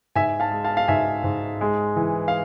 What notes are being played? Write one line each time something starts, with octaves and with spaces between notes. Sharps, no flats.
G#2 E5 G#5
F5 A5
G#3
F5 A5
F5
G#2 E5 G#5
G#2
G#3
E3
F5